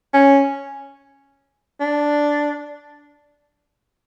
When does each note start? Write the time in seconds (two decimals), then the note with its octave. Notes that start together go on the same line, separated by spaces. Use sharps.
0.14 C#4
1.81 D4